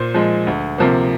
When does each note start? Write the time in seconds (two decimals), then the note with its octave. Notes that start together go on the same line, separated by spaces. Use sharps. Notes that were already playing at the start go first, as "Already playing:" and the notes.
Already playing: A#2 C5
0.14 F3 G#3
0.47 D2
0.78 C3 F3 A#3